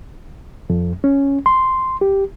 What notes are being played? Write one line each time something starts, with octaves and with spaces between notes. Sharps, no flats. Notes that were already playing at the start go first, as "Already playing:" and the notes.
F2
C#4
C6
G4